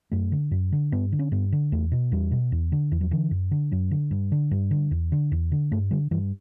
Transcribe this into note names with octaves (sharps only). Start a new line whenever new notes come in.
F#2 A3
D3
F#2
D3
G2 B3
D3
C#4
G2 B3
D3
E2 A3
B2
E2 G3
B2
E2
D3
E2 E3
F#3
D3 E3
F#2
D3
F#2 F#3
D3
G2
D3
G2 G3
D3
E2
D3
E2
D3
G2 A3
D3 G3
G2 E3